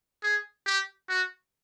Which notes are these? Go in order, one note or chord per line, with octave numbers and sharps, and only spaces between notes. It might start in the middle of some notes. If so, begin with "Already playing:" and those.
G#4
G4
F#4